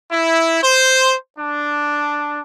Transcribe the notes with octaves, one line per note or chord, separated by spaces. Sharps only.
E4
C5
D4